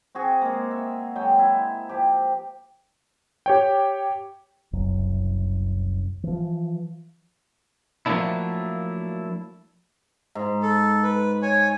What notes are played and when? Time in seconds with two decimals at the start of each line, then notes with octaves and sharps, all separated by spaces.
0.15 C4 F#4 G#4
0.42 G#3 A#3
0.71 E5
1.16 F#3 G#3 G5
1.39 E4
1.89 F3 G4
3.46 G4 C#5 G5
4.73 F#1 C2 F#2
6.23 E3 F3
8.06 F3 F#3 A3 A#3 D4 E4
10.35 G#2
10.63 A4
11.03 B4
11.42 C#5 G#5